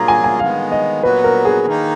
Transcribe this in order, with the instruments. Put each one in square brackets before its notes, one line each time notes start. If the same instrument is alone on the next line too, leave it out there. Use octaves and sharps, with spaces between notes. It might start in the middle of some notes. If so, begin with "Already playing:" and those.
Already playing: [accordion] A#2 F#3 A#3 F4 G#4 [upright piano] A#5
[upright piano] G#5
G#5
[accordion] D#3 G#3 B3 [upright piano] F5
[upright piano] D#5
[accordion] A#2 F#3 B3 F#4 [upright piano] B4
[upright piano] A#4
G#4
[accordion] D#3 A#3 D#4